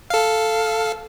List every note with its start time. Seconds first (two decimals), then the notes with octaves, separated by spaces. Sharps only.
0.10 A4 F5